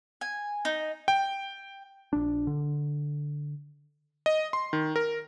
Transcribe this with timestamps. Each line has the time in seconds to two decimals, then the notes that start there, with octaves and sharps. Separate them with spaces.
0.21 G#5
0.65 D#4
1.08 G5
2.13 A#1 D4
2.47 D3
4.26 D#5
4.53 C6
4.73 D#3
4.96 A#4